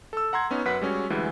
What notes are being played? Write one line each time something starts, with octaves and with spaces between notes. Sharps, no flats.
A4 E6
F#5 A#5 C6 G#6
B3 C#4 D#4
F#2 B4 F#5 B6
G3 G#3 C#4 F#4
D2 E3 G3 G#3